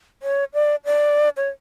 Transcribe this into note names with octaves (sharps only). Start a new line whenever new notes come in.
C#5
D5
D5
C#5